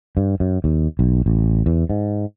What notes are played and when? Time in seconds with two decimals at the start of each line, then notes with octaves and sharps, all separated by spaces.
0.17 G2
0.40 F#2
0.64 D#2
0.99 B1
1.26 A1
1.66 E2
1.90 G#2